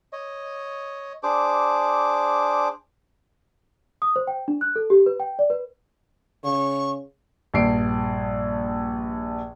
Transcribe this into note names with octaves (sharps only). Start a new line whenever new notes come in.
C#5 D#5
D4 G#4 C5 D6
D#6
C5
G5
D4
F#6
A4
G4
B4
G5
D5
B4
C#3 C#6
A#1 G2 C7 D7